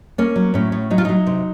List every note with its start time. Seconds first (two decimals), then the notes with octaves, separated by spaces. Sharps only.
0.18 A#3 C#4
0.36 F#3
0.54 A2 C#4
0.72 A2
0.90 F#3 D#4
0.98 F4
1.05 F#3 D#4
1.27 C3